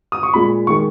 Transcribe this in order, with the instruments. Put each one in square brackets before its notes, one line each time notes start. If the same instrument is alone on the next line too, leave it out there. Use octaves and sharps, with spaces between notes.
[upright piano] D#6
C#6
A#2 G#3 B5
D#3 G#3 C#6